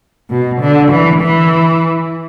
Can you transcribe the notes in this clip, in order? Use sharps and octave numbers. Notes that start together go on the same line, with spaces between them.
B2
D3
E3
E3